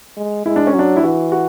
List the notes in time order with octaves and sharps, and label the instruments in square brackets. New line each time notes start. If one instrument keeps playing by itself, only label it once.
[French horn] G#3
[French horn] G#3 [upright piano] E4
[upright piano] D4
C#4
[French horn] F#3
[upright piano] D4
E4
[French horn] E3 [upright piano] F#4
[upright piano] F#4